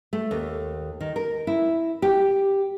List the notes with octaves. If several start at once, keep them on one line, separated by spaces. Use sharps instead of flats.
A3
D#2
D#3
A#4
E4
G4